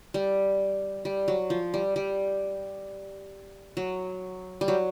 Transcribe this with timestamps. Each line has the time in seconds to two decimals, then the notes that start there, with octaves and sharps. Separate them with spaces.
0.14 G3
1.05 G3
1.28 F#3
1.50 F3
1.74 G3
1.96 G3
3.77 F#3
4.61 G3
4.68 F#3